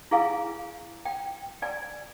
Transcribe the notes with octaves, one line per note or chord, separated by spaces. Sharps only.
E4 G#4 F5 G#5
G5
D5 G#5